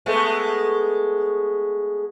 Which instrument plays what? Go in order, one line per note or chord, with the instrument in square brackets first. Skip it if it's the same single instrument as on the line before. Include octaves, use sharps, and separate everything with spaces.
[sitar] G#3 A3 B3